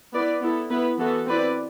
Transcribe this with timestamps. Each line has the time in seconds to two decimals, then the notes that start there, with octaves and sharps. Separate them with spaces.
0.13 B3 E4 B4 D5
0.41 B3 E4 A4
0.70 B3 E4 B4
0.98 E3 B3 F#4 A4
1.26 C4 E4 B4 D5